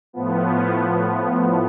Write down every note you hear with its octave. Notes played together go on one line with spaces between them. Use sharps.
A2 F3 B3